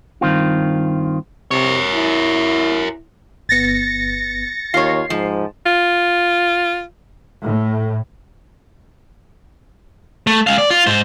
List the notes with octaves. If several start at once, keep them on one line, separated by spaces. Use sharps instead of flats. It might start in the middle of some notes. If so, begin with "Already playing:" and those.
G2 D#3 C4 F4
C3 A#4 C#5
E4
G1 B3 A6 A#6 C#7
D#2 F4 C#5 C7
G#2 F3
F4
A2
A3
G#3 F5
D5
F4
G#2 C5